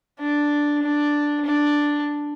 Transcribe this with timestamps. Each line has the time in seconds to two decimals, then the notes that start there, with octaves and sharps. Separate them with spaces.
0.21 D4
0.83 D4
1.45 D4